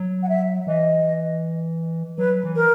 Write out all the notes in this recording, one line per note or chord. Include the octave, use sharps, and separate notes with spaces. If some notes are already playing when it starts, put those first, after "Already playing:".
Already playing: F#3
F#5
E5
E3 D#5
F#3 B4
E3
A#4